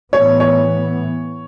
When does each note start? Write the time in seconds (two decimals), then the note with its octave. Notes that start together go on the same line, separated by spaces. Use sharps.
0.12 A2 E3 B3 C#5
0.40 C#5